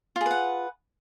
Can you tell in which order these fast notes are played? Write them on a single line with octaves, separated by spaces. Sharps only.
F4 G#4 B4 F#5